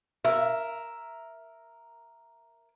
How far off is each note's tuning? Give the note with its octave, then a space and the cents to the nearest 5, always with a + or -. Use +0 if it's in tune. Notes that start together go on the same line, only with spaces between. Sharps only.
A#4 +0 E5 +5